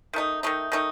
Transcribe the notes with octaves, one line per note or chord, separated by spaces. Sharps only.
D#3 A3 D#4
D#3 A3 D#4
D#3 A3 D#4